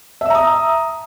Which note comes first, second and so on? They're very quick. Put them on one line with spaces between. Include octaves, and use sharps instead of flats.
E5 E6 A#5 D#6